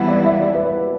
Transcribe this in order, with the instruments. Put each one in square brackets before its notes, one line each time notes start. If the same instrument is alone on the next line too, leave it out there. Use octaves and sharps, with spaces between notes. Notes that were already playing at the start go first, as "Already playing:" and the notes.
Already playing: [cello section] E3 G3 B3 E4 [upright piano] F#5 B5
[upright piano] D5
E5
D5
B4